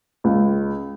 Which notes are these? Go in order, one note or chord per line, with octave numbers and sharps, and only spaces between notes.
C#2